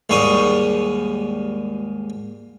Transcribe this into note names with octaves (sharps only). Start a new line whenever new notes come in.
D#2 G#2 G3 C#6 D#6